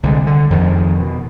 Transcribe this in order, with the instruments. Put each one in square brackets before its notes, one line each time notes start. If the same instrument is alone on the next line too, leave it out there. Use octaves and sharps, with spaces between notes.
[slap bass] C2 D3 G#3
D3
F2 D#3
B2